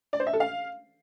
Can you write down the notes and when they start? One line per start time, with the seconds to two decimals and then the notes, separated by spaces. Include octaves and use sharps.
0.13 D5
0.20 C5
0.27 E5
0.33 A4
0.40 F5